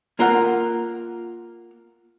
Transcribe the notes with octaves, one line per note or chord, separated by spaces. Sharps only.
A#3 F4 A#4 F#5